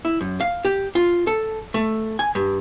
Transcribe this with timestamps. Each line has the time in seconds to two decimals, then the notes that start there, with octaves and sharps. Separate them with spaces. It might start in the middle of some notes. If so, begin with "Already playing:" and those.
0.05 E4
0.21 F#2
0.41 F5
0.65 G4
0.95 F4
1.27 A4
1.74 A3
2.19 G#5
2.35 G2